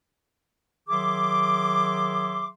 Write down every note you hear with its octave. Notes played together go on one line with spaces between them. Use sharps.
D#3 F#3 G#4 E5 C6 D6